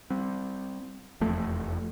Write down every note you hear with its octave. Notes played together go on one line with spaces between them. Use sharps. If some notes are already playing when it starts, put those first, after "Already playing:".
G3 C4
F1 E2 F3 A3